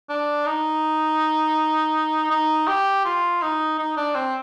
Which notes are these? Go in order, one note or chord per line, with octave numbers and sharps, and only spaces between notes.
D4
D#4
D#4
G4
F4
D#4
D#4
D4
C4